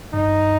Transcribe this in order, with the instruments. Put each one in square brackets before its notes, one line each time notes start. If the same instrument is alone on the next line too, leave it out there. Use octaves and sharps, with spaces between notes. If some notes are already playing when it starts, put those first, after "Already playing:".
[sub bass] G2 [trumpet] D#4